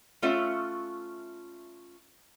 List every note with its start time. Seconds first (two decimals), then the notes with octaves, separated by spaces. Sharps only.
0.22 A3 C#4 F4 E5 F#5